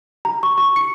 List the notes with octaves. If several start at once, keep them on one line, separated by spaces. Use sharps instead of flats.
A#5
C#6
C#6
C#7